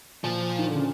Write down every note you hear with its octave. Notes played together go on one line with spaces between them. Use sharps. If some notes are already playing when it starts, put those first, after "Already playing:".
A#2 F3
D#3
D3
C#3